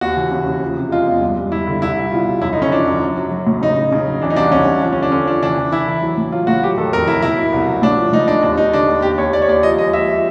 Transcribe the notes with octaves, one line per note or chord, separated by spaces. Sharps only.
D#2 F#4
E3
C#3
C#3
F3
C3
G#3 F4
E2
G2
G2
G2 E4
D3
C2 E4
G3
B2 F4
C2
F#2 E4
D#4
D3
C#4
F3 D4
F#2
F#3
F#3
F#3
A2
C#3 D#4
C#3
C#3
F#3
E3 D4
D#4
C2 D4
C2 C#4
C3
F3 D4
C#4
D3 D4
D3 C#4
F3 D4
E3 D4
E3
E3 E4
E3
F#3
A2
F#3 F4
A2 F#4
F#3 G4
D#3 A4
F2 A#4
F#3 E4
B2 E4
B2
C2
F#3
A2 D4
F3
A2 D#4
G#3 D4
D#2 D4
D#2 D#4
D3 D4
D#2
D#2 G4
D#2 C#5
D#2 D5
C#5
D#2 D5
F3 D#5
G#3 D#5
F3 E5